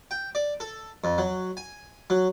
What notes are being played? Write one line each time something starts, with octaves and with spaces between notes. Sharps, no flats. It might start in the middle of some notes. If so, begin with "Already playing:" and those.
G5
D5
A4
F2
F#3
G#5
F#3